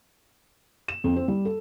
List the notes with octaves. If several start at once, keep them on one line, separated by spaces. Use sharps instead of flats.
E7
F2
C4
G3
A4